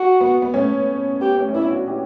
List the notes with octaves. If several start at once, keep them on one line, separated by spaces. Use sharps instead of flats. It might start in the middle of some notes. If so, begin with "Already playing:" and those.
Already playing: F#4
B3
B3
A3 C#4
B3 G4
A3 C#4
C#4
B3 D4 E4
D4 F#4
E4 G4